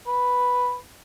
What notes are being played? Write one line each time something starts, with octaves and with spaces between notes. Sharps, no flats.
B4